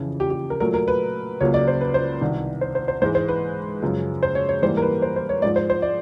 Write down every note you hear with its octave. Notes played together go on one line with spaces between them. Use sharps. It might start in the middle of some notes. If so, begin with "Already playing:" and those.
Already playing: F2 C#3 E3
G4
G4
A#4
A#2 F#3 A3 A#4
A#4
B4
C#2 C#3 F#3 A#3 C#5
D5
C5
B4
C5
C2 C3 D#3
C5
C5
C5
G#2 E3 G#3 C5
C5
B4
F#2 C#3 F3 G#3
C5
C#5
C#5
G#2 E3 G3 A#3 C5
A#4
B4
C5
C5
C#5
G#2 F3 G#3 D5
C5
C5
D5